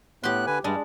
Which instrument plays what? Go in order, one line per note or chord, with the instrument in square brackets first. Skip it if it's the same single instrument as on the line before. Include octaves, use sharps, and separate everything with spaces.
[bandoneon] A2 B3 F#6 [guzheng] G4 C6
[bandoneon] D3 B4 G#5
[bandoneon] G2 G3 [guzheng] G#3 D4